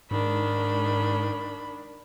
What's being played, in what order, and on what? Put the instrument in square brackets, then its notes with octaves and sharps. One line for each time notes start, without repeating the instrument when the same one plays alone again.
[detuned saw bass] G#2 [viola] D#3 D4 [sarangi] B5